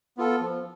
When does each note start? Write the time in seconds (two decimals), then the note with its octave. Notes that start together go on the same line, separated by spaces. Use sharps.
0.18 B3 F4 A4
0.41 F3